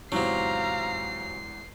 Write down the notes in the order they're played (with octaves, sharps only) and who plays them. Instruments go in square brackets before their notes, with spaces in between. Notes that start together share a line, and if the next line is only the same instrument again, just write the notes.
[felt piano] E2 G#2 [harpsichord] C3 F#3 [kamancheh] F5 A#5 [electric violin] C7